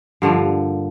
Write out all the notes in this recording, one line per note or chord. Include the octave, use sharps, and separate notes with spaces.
G2 D3 F3 A#3